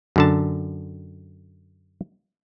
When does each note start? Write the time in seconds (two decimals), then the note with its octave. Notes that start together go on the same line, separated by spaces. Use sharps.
0.16 F#2 D3 A5